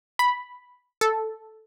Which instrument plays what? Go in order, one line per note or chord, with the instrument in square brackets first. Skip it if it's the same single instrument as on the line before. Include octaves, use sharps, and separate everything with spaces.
[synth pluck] B5
A4